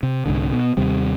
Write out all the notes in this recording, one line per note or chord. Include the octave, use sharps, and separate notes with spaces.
C3
C2 G#2 D3
B2
D#2 C3 G3